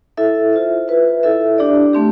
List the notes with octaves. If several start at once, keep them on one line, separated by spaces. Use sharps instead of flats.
E4 A4 E5
F4 C5 E5
F4 B4 E5
E4 A4 E5
D4 G4 D5
A3 C4 G4